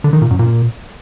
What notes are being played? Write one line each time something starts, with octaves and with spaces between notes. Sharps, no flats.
D3
D#3
A#2
F#2
A#2